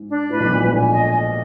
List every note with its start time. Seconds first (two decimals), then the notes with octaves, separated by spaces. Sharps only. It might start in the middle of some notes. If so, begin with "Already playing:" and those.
Already playing: G#2
0.09 D4
0.29 A2 B4
0.40 B1 B2
0.51 A#1 A#2 G#5
0.62 G#2
0.72 A#1 A#2 G#5
0.93 D#5
1.13 D#5